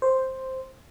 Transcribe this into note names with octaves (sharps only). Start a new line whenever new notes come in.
C5